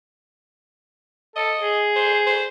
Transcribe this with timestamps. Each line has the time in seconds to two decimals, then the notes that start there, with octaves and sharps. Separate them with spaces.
1.36 A4 D#5
1.60 G#4
1.96 C5
2.26 C5